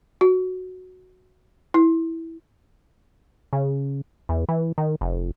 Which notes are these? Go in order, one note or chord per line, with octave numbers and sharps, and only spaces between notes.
F#4
E4
C#3
E2
E3
D#3
F1